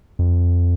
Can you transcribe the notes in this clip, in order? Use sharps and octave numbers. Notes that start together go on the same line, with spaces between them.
F2